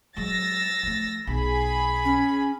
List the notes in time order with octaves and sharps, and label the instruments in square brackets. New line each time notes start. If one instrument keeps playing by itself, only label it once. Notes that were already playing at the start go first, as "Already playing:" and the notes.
[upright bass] F#3 G#3 [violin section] E6 A6 A#6
[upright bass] F3 A3
[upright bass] B1 [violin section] G#4 B5
[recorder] C#4